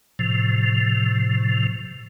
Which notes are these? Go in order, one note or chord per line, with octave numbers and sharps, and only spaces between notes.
A2 C3 F3